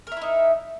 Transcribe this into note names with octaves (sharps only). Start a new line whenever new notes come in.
D#4 E4 A#4 E5